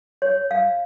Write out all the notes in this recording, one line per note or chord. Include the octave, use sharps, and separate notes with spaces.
C#5
F5